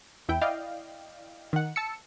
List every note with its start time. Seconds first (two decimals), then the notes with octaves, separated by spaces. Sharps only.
0.29 E2 E4 G5
0.41 E4 D5 D#5 F5 G5
1.53 D#3 F#5
1.76 A5 E6 C#7